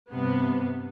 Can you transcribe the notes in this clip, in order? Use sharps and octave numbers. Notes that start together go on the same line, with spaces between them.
G2 C3 B3